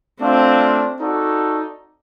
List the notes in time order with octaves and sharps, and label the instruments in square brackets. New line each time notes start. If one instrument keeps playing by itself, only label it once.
[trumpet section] A3 D4 F4 [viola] C4
[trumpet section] D#4 F#4 A4 D5